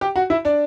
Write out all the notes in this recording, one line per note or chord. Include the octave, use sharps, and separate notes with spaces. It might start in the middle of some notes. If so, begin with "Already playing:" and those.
G4 G5
F#4 F#5
E4 E5
D4 D5